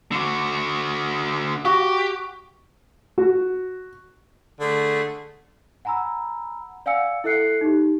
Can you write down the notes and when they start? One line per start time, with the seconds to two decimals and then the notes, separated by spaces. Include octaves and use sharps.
0.12 D3 F#4
1.65 F#4 G4
3.18 F#4
4.60 D3 A3 G#4
5.85 F#5 G#5 A#5 B5 E6
6.86 D5 F5 F#5 G#5 E6 C#7
7.24 E4 A4 E5 F#6 C7 C#7
7.61 D#4 G4